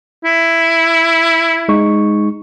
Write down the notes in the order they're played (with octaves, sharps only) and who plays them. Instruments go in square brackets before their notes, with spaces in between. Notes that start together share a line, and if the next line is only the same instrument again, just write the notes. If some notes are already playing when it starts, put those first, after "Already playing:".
[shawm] E4
[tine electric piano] G#3 D#4 C#6